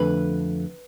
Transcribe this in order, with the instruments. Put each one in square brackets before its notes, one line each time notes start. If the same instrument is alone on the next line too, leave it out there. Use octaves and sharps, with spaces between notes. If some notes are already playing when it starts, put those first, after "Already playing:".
Already playing: [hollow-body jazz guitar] F2 D3 A3 B4